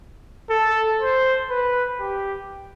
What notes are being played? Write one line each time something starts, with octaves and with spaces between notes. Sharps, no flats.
A4
C5
B4
G4